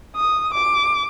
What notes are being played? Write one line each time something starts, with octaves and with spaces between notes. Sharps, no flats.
D#6
D6